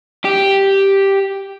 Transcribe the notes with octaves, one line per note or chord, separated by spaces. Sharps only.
G4